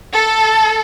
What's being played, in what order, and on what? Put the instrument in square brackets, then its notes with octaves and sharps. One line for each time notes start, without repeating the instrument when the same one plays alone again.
[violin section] A4